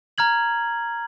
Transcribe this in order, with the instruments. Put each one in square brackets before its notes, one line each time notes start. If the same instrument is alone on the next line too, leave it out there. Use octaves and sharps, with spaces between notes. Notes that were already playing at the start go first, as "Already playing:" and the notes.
[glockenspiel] A#5 F6 G#6 F#7